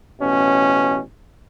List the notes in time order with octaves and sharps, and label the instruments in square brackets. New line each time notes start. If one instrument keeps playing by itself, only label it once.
[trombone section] A1 B2 C#4